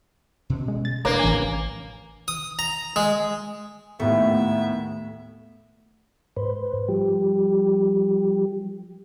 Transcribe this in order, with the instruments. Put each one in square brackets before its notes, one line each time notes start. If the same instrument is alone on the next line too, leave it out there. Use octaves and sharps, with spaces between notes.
[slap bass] B2 C#4
[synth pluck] G#3
A6
[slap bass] F1 F#2 D4 [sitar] A#3 [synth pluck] B4 C#5 A#5
[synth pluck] A1 G#5
[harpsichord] D#6
A#5
G#3
[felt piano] D#2 A2 [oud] A3 [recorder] B3 [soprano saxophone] E5
[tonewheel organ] G#2 B4 C5
F3 G3 G4